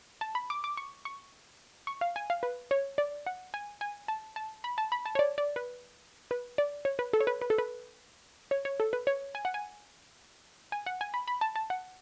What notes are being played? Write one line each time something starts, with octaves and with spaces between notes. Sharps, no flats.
A5
B5
D6
D6
C#6
C#6
C#6
F5
G#5
F5
B4
C#5
D5
F#5
G#5
G#5
A5
A5
B5
A5
B5
A5
C#5
D5
D5
B4
B4
D5
C#5
B4
A4
C#5
B4
B4
A4
B4
C#5
C#5
A4
B4
C#5
G#5
F#5
G#5
G#5
F#5
G#5
B5
B5
A5
A5
F#5